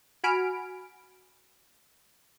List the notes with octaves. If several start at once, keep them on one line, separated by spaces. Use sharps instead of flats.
F#4 G#5 B5 F6 D7